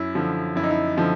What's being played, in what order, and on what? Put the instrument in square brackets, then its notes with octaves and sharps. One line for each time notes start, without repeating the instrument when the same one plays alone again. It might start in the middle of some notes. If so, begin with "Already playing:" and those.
Already playing: [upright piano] F#2 E4
D3 F3
F#2 E4
D#4
E4
D3 F3